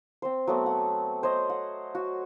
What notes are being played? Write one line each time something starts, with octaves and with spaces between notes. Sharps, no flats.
C4 C5
F#3 A3 B3 C4
F#5
C5 C#5 D#5
F#5
F#4